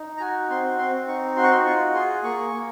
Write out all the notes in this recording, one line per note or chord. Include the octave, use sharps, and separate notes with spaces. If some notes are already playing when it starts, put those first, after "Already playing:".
Already playing: D#4
A#5
F#4 G#5
C4 C6
C4 C6
D#4 C#6
F#4 C6
C#6
C6
F4 C#6
G#4 C6
A#3 C#6
A#3